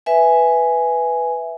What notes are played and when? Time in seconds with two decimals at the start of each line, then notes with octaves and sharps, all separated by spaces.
0.06 B4 E5 G#5